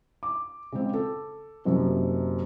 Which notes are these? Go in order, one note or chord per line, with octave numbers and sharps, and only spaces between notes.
D6
C#3 G#3 C4
A4
F#1 F#2 C3